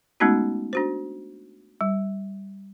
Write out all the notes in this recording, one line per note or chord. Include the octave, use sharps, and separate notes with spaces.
G#3 A3 B3 C#4 D#4 F#4
D4 F#4 C5
G3